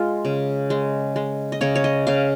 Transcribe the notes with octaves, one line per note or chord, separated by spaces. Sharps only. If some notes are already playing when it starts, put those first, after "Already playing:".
Already playing: G#3 F4
C#3
G#3
G#3
D#5
C#3 C#5
C#5
D#5
C#3 F5